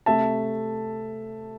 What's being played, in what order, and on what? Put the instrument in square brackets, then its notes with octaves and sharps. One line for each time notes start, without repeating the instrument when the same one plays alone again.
[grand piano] C3 A3 E5 A5